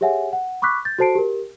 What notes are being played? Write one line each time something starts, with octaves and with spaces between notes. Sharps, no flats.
G4 G#4 C#5 E5 F#5 G#5
F#5
B5 C#6 D6 E6 F#6 B6
G6 A6
F#4 A4 C5 A5 C7 D7
G4 A#4